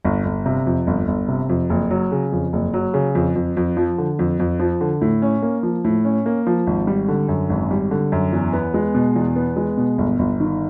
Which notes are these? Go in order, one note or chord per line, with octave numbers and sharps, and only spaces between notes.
G1
G1
C3
F2
G1
G1
C3
F2
F#1
F#3
C#3
F2
F#1
F#3
C#3
F2
F2
F2
F3
D3
F2
F2
F3
D3
A2
C#4
A#3
F3
A2
C#4
A#3
F3
G#1
G3
D3
F#2
G#1
G3
D3
F#2
E2
B3
G#3
B2
E2
B3
G#3
B2
G1
G1
D#3